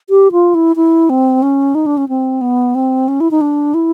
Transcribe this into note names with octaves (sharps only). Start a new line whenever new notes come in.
G4
F4
E4
E4
C4
C#4
D#4
D4
C#4
C4
B3
C4
C#4
E4
D#4
D4
E4